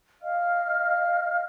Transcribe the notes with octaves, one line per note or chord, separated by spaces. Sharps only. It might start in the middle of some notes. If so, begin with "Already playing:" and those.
D#5 F5 F6